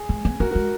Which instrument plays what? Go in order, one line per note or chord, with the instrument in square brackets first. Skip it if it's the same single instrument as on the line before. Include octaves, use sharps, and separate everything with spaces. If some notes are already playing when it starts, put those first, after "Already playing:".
Already playing: [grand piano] G#4
[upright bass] G#3
B3
[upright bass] B3 [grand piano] F#4 A#4
[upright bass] G#3 [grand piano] F#4 A#4